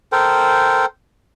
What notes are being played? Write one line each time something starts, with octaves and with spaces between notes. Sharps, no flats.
A4 A#4 C5 G5